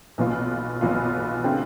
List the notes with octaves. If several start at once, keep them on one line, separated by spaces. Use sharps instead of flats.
B1 B2 B3 F4
B1 B2 B3 F4
D3 A3 C4 G4